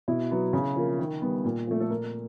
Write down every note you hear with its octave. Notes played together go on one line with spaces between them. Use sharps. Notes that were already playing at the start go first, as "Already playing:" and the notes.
B2 E4
F#3 B3
C#3
F3 A#3
D#3
G3 B3
A#2
F3 A3
A4
A#2 A#4